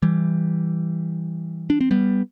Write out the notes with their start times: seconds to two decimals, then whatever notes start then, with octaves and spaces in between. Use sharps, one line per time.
0.02 E3 G3
1.70 D4
1.81 C4
1.91 G3 B3